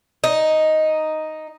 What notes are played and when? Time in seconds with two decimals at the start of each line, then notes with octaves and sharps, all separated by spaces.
0.24 D#4